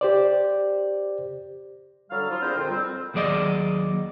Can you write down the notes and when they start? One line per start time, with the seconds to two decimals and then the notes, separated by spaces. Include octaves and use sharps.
0.01 G4 C5 D5
2.10 D3 F#3 G3 A4 F5
2.30 F3 E4 F4
2.42 C4 D4 E4 G#4 A#4 C5
2.55 F2 A#2 D3 F4 C5 G5
2.69 F2 G3 C4
3.14 D#2 F#3 G#4 D5 D#5